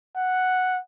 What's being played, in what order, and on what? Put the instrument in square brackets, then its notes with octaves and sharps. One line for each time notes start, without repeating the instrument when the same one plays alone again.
[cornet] F#5